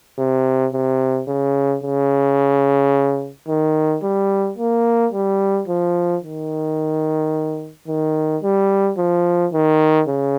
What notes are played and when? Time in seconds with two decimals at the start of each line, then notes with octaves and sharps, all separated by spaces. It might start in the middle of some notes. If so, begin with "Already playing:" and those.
0.18 C3
0.73 C3
1.28 C#3
1.83 C#3
3.48 D#3
4.03 G3
4.58 A#3
5.13 G3
5.68 F3
6.23 D#3
7.88 D#3
8.43 G3
8.97 F3
9.53 D#3
10.08 C#3